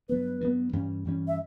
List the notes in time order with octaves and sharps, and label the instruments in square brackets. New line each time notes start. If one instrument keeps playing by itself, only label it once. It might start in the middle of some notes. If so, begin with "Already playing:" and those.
[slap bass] G2 F#3 B3 [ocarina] B4
[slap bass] G2 F#3 B3
G2 E3 G3 C#4
G2 E3 G3 C#4
[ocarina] E5